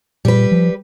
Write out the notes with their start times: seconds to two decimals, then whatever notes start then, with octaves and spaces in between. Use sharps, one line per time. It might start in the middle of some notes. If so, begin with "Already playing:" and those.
0.25 A#2 G3 B4
0.51 F3